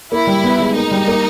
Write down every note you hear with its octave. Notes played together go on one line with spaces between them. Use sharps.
A#3 E4
G3
B3
G#3
A#3 D#4
G3
A#3